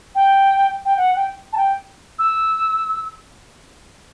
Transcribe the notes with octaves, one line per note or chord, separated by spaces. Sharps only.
G5
G5
F#5
G5
A5
G5
E6